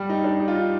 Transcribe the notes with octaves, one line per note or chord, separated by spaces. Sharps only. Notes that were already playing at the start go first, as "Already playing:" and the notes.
Already playing: G3 G4
D#4
D4
D#4
F4
D#4